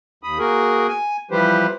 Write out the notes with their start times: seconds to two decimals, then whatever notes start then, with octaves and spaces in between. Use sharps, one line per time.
0.23 D#2 B5 D#6
0.39 A#3 F#4 G#4 A#4
0.89 G#5
1.31 E3 F3 G3 G4 B4 C5